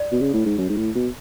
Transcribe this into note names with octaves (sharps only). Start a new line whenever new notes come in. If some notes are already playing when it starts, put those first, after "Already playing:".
Already playing: D5
B2
C#3
A2
G#2
F#2
G#2
A2
B2